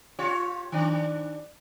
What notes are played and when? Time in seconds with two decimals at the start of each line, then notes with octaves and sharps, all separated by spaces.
0.19 F4 G4 C#5
0.72 D#3 D4